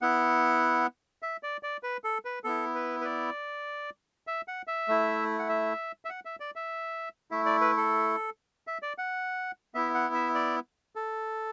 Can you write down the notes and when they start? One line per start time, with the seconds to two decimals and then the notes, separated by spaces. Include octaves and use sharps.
0.02 B3 E4 F#5
1.23 E5
1.43 D5
1.63 D5
1.83 B4
2.04 A4
2.25 B4
2.44 B3 E4 A4
2.75 B4
3.01 B4
3.05 D5
4.27 E5
4.48 F#5
4.67 E5
4.88 A3 E4
5.39 F#5
5.49 E5
6.05 E5
6.09 F#5
6.25 E5
6.40 D5
6.56 E5
7.31 A3 E4 E5
7.46 D5
7.61 B4
7.77 A4
8.67 E5
8.82 D5
8.98 F#5
9.74 B3 E4 E5
9.94 F#5
10.14 E5
10.35 D5
10.96 A4